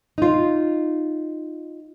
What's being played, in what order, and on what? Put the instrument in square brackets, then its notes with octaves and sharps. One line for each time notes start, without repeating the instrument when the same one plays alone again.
[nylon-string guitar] D#4 F4